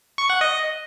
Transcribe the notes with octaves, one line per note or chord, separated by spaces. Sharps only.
C#6
F#5
D#5